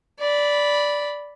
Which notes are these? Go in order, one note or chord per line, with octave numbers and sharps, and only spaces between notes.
D5 B5